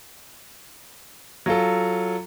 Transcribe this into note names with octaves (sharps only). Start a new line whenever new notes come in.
F#3 F4 A4